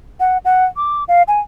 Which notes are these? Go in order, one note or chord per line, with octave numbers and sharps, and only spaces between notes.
F#5
F#5
D6
F5
G#5